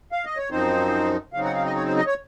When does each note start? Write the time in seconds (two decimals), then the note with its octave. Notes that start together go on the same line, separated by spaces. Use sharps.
0.12 F5
0.25 D#5
0.37 C#5
0.50 F#2 F3 C4 D#4 C5
1.33 C#3 F#3 C4 D#4 F5
1.45 F#5
1.55 F5
1.65 D#5
1.76 C#5
1.86 C5
1.97 D#5
2.07 C#5